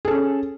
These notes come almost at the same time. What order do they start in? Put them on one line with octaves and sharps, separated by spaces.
G#4 A4 C#4